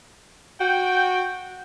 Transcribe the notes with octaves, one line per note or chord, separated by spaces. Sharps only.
F#4 G5